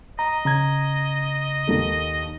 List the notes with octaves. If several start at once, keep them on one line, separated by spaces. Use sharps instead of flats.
D#5 A#5
C#3 A#5 G#6
D#2 D#3 A4